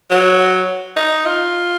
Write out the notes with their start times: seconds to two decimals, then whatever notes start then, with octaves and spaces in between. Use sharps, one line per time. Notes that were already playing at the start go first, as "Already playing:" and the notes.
0.10 F#3
0.96 D#4
1.25 F4